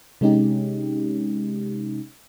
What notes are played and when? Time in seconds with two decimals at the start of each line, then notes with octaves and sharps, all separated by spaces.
0.21 C3 G#3 C#4 D#4 G4